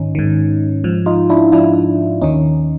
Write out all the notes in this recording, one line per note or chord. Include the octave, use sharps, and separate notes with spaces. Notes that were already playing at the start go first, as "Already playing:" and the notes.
Already playing: G#2 D#3 C#4 D#4
G#2 D#3
G#2 F3
D#4 F4
D4 E4
G#2 F3 D4 E4
D#2 D#3 C#4 D#4